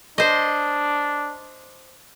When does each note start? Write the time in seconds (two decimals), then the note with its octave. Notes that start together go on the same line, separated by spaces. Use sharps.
0.18 D4 C5 D#5